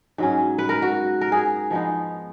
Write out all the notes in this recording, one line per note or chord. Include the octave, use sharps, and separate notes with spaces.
G#2 F#3 C#4
B4
A#4
F#4
A#4
G#4
F3 G#3 B3 D#4